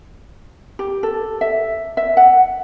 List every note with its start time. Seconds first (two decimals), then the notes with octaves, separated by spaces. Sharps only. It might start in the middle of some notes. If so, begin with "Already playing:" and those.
0.79 G4
1.03 A4
1.41 E5
1.97 E5
2.17 F#5